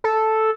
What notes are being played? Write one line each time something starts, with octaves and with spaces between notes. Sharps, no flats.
A4